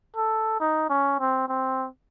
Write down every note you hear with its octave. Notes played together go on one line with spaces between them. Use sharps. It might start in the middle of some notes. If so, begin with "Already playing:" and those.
A4
D#4
C#4
C4
C4